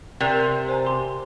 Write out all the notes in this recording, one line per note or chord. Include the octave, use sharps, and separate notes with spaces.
C3 A#4 D5
C5 G#5 A#5
G4 C6